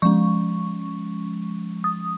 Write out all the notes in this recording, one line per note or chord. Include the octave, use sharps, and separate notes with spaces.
F3 G#3 C#4 C#6
D#6